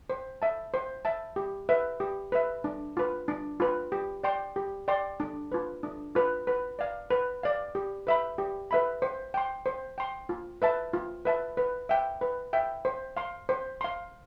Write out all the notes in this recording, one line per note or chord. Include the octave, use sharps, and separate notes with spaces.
C5
E5 A5
C5
E5 A5
G4
B4 E5
G4
B4 E5
D4
F4 B4
D4
F4 B4
G4
D5 G5 C6
G4
D5 G5 C6
D4
F4 B4
D4
F4 B4
B4
D5 F5
B4
D5 F5
G4
B4 E5 B5
G4
B4 E5 B5
C5
G5 C6
C5
G5 C6
F4
B4 E5 A5
F4
B4 E5 A5
B4
E5 G5
B4
E5 G5
C5
F5 C6
C5
F5 C6